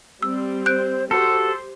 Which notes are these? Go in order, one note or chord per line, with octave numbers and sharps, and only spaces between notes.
G3 C4 E6
C5 F#6 G6 D7
F#4 G4 A4 C5